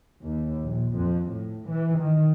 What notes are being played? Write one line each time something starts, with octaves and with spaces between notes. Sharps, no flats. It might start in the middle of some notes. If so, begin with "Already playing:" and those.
D#2
A#1
F2
A2
E3
D#3